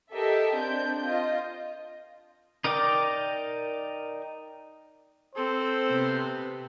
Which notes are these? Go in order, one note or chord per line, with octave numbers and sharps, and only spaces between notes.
G4 A4 A#4 D#5 E5
C4 D4 G6
F4 D#5
D#4 A#4 D5 G5 D6
C4 A4 C5
C3 B3